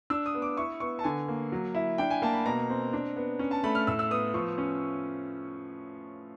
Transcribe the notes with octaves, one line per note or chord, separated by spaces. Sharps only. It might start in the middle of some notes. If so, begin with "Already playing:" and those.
D4 E6
D#6
B3
D6
E4 C#6
B3 C#6
A5
D3 G#5
A#3
F#3
E4
D4 G5
G#5
A#3 A5
B5
B2 A#5
C4
D4
B3
C#4
A5
A3 B5
F6
A2 E6
E6
B3 D#6
F3 C#6
C#4